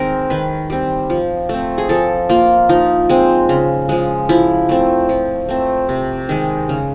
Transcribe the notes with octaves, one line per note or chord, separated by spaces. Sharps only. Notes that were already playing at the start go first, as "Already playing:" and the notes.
Already playing: D#3 G#3 C4 A#4
D#3 B4
G3 C4
F3
A3 C4
G#4
F3 A4
A#3 F4
F3 D#4
G#3 C4
C#3
F3 G#3
F3 E4
A3 C4
F3
A3 C4
C3
D#3 G#3
C#3